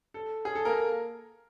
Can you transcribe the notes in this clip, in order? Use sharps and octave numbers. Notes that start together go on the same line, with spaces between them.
A4
G#4
A4
A#3 A#4